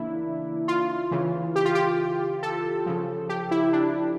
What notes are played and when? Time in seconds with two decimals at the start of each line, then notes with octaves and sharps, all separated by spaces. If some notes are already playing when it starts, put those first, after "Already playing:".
Already playing: C#3 E3 A#3 D4 E4
0.68 F4
1.11 C#3 E3
1.56 G4
1.65 F4
1.75 G4
2.43 A4
2.86 C#3 F3
3.29 G4
3.51 E4
3.73 D4